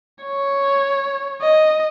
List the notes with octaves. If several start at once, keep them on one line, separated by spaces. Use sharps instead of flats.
C#5
D#5